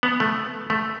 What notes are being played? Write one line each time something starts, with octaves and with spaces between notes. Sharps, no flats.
B3
A3
A3